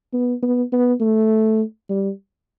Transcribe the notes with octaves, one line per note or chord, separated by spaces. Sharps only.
B3
B3
B3
A3
G3